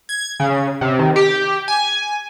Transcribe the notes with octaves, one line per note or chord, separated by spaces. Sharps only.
G#6
C#3
C3
D#3
G4
G#5